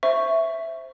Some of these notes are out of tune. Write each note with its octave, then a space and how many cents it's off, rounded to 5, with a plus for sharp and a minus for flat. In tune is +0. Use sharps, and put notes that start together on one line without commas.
C5 +0 E5 +0 C#6 +0